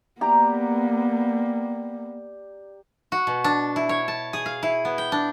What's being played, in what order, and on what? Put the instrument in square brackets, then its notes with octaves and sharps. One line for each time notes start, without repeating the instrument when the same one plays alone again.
[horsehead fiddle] A#3 B3 [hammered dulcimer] G4 D5 A#5
[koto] F#4
B2
D4
E4
C#5
A5
G#4
F5
E4
B3
G5
D4